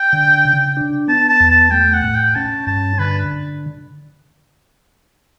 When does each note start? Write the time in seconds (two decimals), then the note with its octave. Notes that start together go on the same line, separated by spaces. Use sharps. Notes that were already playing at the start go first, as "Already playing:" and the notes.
Already playing: G5
0.13 D3
0.45 C#3
0.77 D4
1.08 B3 A5
1.29 A5
1.40 E2
1.50 A5
1.71 A3 G5
1.93 F#5
2.04 A2
2.14 G5
2.35 C#4 A5
2.67 G2 A5
2.99 D3 B4